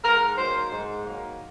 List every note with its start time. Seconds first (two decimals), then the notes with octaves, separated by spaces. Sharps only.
0.03 G#2 A#4
0.37 D#3 F#3 A#3 C5
0.71 G#2
1.04 D#3 F#3 A#3